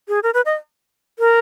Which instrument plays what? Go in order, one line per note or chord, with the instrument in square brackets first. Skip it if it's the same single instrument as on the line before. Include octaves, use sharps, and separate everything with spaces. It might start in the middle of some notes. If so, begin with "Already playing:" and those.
[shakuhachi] G#4
A#4
B4
D#5
A#4